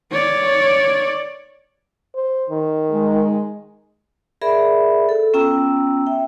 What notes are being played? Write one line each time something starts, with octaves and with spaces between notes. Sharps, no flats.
C#5 D5
C5
D#3
G#3
G#4 A#4 D5 E5 B5
A4
B3 C#4 F4 G5 A#5 E6
E5 G5